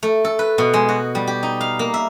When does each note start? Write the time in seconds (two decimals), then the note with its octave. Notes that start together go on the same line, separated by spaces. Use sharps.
0.03 A3
0.25 A4
0.39 B4
0.58 B2
0.74 G#3
0.89 F#4
1.15 G3
1.27 G4
1.43 D#4
1.61 F5
1.79 A#3
1.94 E5